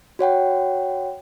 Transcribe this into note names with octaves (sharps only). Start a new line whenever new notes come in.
F#4 C#5 F#5 G5